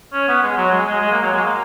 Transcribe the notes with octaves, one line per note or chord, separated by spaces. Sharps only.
C#4
B3
G#3
F#3
G#3
G#3
G#3
A#3
F#3
G#3
A#3